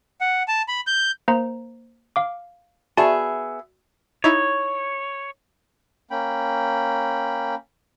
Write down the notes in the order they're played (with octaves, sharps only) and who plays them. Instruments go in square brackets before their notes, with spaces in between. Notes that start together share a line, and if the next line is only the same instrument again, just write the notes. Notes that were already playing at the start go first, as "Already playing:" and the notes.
[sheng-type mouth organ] F#5
A5
B5
G6
[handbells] A#3 C5 A#5
F5 D6
[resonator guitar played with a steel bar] B3 G#4 E5 [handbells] F#4 D5 A5
[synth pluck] D#4 E4 [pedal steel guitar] C#5
[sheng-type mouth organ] A#3 C#4 G5 B5